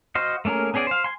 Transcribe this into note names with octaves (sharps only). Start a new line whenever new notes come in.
F#4 C5 D#5 F5
A3 A#3 C#4 G#4 A#4
B3 C#4 G#4 D5 G#5
C5 F5
G#5 C6